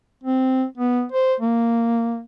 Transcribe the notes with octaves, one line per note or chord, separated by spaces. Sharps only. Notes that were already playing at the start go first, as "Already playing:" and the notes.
C4
B3
C5
A#3